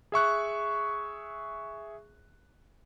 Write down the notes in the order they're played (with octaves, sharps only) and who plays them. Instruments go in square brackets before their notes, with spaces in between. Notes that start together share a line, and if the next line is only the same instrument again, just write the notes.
[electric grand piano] G#4 E5 C#6 F#6